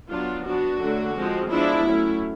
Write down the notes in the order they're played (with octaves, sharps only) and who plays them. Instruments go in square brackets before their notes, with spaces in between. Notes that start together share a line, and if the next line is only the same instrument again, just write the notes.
[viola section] F#3 B3 D4 F4
F#3 B3 D4 F#4
D3 F#3 A3 D4
F3 G#3 C4
F3 G#3 B3 D4 E4
F#3 A3 C#4